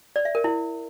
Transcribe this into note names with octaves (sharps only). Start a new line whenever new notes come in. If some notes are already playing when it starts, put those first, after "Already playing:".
D5
E5
A#4
E4